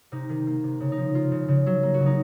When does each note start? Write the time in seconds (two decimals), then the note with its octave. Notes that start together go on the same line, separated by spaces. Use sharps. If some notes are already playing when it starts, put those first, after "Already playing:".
0.12 C3 D#4
0.29 D#3
0.47 A#3
0.64 C3
0.80 C#3
0.92 D#4
0.98 F3
1.14 G#3 F4
1.31 C#3
1.48 C#3
1.66 F#3
1.83 A#3
1.94 F#4
2.00 C#3
2.06 D#4